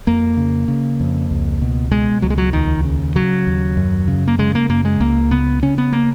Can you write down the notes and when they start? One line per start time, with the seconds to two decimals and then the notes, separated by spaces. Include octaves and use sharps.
0.07 F2 A#3
0.37 C#3
0.68 C#3
1.00 F2
1.31 C#2
1.62 B2
1.91 B2 G#3
2.22 C#2 F#3
2.30 G#3
2.38 F#3
2.53 D#2 D#3
2.85 C#3
3.15 C#3 F#3
3.47 D#2
3.77 F#2
4.08 C#3
4.28 A#3
4.39 C#3 G#3
4.55 A#3
4.69 F#2 A#3
4.85 G#3
5.00 C#2 A#3
5.31 C#3 B3
5.62 C#3 C#4
5.78 B3
5.93 A#3